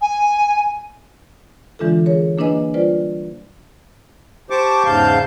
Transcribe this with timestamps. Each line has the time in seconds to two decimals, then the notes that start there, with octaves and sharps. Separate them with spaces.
0.01 G#5
1.79 D3 E3 G#3 D4 F4 A4
2.06 G#4 A#4 C#5
2.38 A#3 D4 E4 B4 D#5 G#5
2.74 G3 F4 B4 C5 D5
4.50 G4 C5 A5 C#6 D6
4.85 E2 G#2 C#3 F5 A5 G6